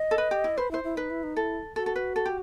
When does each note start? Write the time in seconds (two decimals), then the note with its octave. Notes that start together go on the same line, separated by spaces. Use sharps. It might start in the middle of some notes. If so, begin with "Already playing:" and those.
Already playing: D#5
0.11 A4
0.18 B4
0.31 G4
0.44 E4
0.58 B4 C5
0.71 E4 C5
0.84 E4
0.97 D#4 B4
1.10 E4
1.23 D#4
1.36 E4 A4
1.76 F#4 A4
1.86 A4
1.96 B4
2.16 A4
2.26 G4